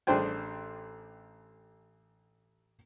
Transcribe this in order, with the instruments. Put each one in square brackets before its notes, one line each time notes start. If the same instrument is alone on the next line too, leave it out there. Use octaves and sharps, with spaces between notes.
[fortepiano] A1 D4 G#4 C5 G5 G#5